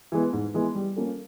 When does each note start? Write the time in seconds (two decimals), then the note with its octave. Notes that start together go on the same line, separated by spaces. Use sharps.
0.12 E3 G#3 B3
0.33 G#2
0.54 E3 G#3 B3
0.75 G3
0.96 A#3 C#4 F4 A4